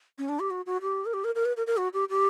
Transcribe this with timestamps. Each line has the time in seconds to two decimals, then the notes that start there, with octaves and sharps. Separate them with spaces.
0.18 C#4
0.29 D4
0.40 G4
0.50 F#4
0.66 F#4
0.82 G4
1.06 A#4
1.14 G4
1.24 A#4
1.35 A#4
1.45 B4
1.57 A#4
1.67 A#4
1.77 F#4
1.94 G4
2.10 G4